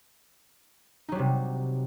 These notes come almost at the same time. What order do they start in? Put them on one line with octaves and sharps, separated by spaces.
D#4 F#3 G3 C3